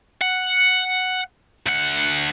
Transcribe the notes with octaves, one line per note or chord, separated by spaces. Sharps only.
F#5
D2 F#5